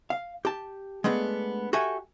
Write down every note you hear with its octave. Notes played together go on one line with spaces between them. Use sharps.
F5
G4 A5
G#3 A3 B3 D4
F#4 G4 A4 E5 G#5